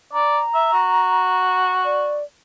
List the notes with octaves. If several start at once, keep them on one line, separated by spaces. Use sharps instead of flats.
D5 A#5
E5
F#4
D5